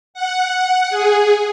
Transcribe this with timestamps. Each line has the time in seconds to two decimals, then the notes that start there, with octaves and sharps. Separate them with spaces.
0.14 F#5
0.90 G#4